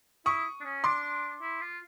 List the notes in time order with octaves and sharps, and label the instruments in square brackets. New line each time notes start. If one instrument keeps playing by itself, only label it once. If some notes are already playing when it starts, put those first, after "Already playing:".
[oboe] E4 [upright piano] C#6 D#6
[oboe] D4
C#4
[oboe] D4 [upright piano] C6 D6
[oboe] E4
F4